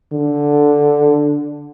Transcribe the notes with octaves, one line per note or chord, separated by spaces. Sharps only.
D3